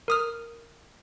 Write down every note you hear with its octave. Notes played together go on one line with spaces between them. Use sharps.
A#4 D#6 F6